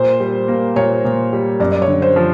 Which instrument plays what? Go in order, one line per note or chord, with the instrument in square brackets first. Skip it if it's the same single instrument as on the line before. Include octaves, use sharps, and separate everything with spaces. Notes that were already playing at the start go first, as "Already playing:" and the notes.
Already playing: [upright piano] A#2 [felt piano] C5
[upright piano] G3
A#3
[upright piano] A#2 [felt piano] C#5
[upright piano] A#2
G3
[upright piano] F#2 [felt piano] D5
[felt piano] D5
C#5
[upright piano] D3
[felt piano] C5
[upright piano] F3